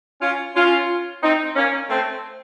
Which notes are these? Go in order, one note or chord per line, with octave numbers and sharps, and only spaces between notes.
C#4 F4
C#4 F4
C4 D#4
A#3 C#4
A3 C4